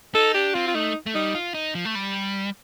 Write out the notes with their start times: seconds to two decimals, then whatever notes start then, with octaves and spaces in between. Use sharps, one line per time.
0.15 D#4 A4
0.34 D4 G4
0.54 C4 F4
0.68 F4
0.74 A3 D#4
1.06 A3
1.15 G3 D#4
1.35 F4
1.54 D#4
1.75 F3
1.85 A3
1.95 G3